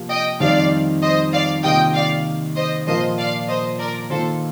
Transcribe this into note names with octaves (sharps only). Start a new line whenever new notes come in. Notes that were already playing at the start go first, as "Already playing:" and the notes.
Already playing: C3 F3 A#3
D#5 G5
F2 D#3 G3 C4 D#4 D5 F5
C5 D#5
D5 F5
C3 D#3 A#3 F4 D#5 G5
D5 F5
C5 D#5
A#2 F3 A#3 F4 A#4 C5 D#5
D5 F5
C5 D#5
A#4 D5
D#3 A#3 F4 A4 C5